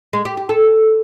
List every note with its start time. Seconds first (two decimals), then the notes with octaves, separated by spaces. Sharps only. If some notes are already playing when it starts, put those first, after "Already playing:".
0.13 G#3
0.25 G4
0.37 G4
0.49 A4